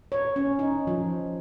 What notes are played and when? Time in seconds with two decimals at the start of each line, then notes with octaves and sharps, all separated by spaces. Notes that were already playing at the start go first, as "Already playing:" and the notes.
0.12 C#5
0.36 C#4
0.59 D#4
0.87 F3